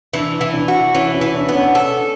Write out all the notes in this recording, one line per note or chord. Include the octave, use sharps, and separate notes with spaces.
E3 D4
E3
D4
F#4
E3 C#4
C#4
E3
D4
B3 D4
C#4
A4